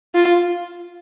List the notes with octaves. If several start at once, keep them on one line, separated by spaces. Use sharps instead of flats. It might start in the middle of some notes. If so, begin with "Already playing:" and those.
F4